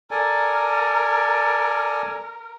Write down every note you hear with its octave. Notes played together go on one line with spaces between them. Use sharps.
A4 A#4 D5 G#5